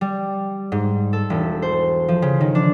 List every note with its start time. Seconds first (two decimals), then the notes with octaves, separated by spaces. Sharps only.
0.01 G3
0.72 G#2
1.13 A4
1.30 E1
1.62 C5
2.08 F3
2.22 C#3
2.41 D#3
2.55 D4